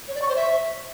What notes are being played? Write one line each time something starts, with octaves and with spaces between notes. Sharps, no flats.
C#5
D5
C#6
C5
E5